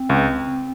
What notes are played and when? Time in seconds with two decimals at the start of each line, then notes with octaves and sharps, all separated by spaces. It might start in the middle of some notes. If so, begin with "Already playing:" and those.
Already playing: C4
0.10 C#2